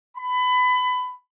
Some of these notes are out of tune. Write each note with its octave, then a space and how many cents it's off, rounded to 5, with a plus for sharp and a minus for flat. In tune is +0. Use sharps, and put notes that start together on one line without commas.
B5 +25